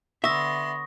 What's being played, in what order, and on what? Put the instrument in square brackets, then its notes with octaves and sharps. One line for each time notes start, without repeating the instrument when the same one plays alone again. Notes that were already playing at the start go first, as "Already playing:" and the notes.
[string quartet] D3 B3 C6 [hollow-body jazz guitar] E5 [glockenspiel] C#6 D#6 A#6